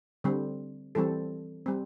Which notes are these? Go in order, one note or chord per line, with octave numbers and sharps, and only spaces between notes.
D3 G3 C4
E3 G3 C4 A4
G3 C4